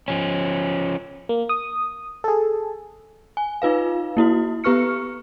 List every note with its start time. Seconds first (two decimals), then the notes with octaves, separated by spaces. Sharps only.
0.08 F3 C#4
1.29 A#3
1.49 D#6
2.24 G#4 A4
3.37 G#5
3.62 D#4 F4 B4 F5
4.17 A#3 E4 F#4
4.64 B3 G4 B4 C#6 F6 C#7